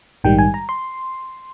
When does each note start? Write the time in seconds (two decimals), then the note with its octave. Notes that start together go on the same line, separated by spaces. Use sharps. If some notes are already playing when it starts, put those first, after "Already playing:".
0.24 A#1 G#2 D#3 G3 G5
0.39 G#5
0.54 A#5
0.69 C6